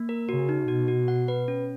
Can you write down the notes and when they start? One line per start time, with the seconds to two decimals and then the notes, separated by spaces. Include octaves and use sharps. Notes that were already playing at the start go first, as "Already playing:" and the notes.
Already playing: A#3
0.09 A#4
0.29 C#3 F#4
0.49 D#4
0.68 B2 F#4
0.88 F#4
1.08 F#5
1.28 B4
1.48 C#4